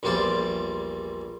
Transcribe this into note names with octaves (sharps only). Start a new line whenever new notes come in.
A#1 E2 G3 F4 C5 D5